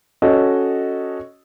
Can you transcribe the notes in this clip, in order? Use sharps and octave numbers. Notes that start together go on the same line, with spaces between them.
C#4 F#4 A4 D#5